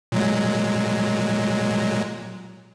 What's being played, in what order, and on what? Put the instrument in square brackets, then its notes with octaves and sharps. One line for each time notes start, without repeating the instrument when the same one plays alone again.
[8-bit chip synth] A#2 F#3 G#3